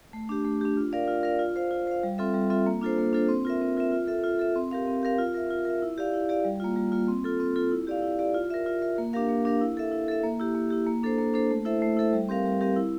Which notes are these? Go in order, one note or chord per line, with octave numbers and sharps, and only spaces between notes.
A3
D4 G4
A3
D4 G4
F4
A#4 D5 F5
F4
A#4 D5 F5
F4
C5 F5
F4
C5 F5
G3
C4 F4 A4 E5
G3
C4 F4 A4 E5
A#3
D4 F4 A4 C5
A#3
D4 F4 A4 C5
C4
F4 A#4 E5
C4
F4 A#4 E5
F4
A4 E5
F4
A4 E5
C4
G4 A#4 F5
C4
G4 A#4 F5
F4
A#4 E5
F4
A#4 E5
E4
G4 D5 F5
E4
G4 D5 F5
G3
A#3 F4
G3
A#3 F4
C4
F4 A4
C4
F4 A4
E4
G4 D5 F5
E4
G4 D5 F5
F4
A#4 E5
F4
A#4 E5
A#3
D4 G4 A#4 F5
A#3
D4 G4 A#4 F5
E4
A4 E5
E4
A4 E5
A#3
E4 G4
A#3
E4 G4
A#3
D4 A4 C5
A#3
D4 A4 C5
A3
E4 A4 C5 E5
A3
E4 A4 C5 E5
G3
C4 G4 A#4 F5
G3
C4 G4 A#4 F5
E4